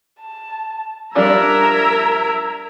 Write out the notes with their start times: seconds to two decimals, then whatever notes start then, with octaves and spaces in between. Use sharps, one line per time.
0.20 A5
1.15 F3 G3 D4 A#4 E5 A#5 E6 G#6